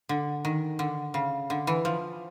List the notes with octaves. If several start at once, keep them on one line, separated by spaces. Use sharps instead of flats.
D3
D#3
D3
C#3
D3
E3
F3